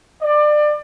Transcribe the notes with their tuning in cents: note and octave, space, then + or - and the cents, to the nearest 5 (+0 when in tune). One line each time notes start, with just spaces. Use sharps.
D5 +25